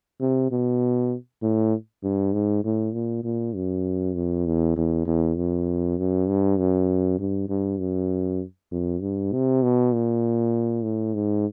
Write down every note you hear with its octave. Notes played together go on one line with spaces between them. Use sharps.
C3
B2
A2
G2
G#2
A2
A#2
A#2
F#2
F2
E2
E2
E2
F2
F#2
G2
F#2
G2
G2
F#2
F2
G2
C3
B2
A#2
A2
G#2